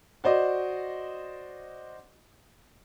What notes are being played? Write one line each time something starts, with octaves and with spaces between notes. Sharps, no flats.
F#4 C5 D5 D#5